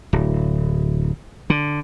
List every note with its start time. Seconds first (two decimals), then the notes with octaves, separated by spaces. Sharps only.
0.13 D1
1.50 D3